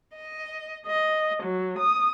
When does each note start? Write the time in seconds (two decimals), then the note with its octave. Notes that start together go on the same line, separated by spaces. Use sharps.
0.15 D#5
0.86 D#5
1.44 F#3
1.79 D#6